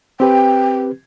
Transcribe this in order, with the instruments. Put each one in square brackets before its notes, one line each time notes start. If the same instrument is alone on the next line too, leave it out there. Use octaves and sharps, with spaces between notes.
[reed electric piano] C4 G4 B4 [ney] G5